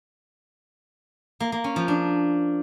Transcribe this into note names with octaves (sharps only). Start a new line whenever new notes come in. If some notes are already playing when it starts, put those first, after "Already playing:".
A#3
A#3
C#4
F3
D4